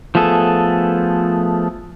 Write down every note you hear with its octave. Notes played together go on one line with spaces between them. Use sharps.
F3 A3 B3 G#4 A4